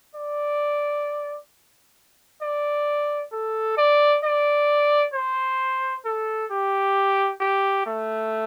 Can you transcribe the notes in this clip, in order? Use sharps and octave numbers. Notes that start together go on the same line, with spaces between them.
D5
D5
A4
D5
D5
C5
A4
G4
G4
A3